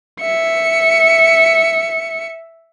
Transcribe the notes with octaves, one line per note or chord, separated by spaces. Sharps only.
E5 C#7